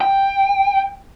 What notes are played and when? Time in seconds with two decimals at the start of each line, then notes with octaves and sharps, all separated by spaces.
0.01 G5